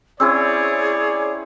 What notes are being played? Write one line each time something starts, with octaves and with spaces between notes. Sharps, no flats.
C4 C#4 E4 G#4 C#5 D5 E6